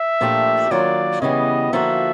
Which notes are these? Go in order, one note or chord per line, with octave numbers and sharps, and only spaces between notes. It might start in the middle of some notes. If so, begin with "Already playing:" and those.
Already playing: E5
A#2 F3 A3 D4 G4
D#3 F#3 A#3 D4 F4 D5
C#3 E3 G3 B3 D#5
D3 F3 A#3 D#4 F#4 E5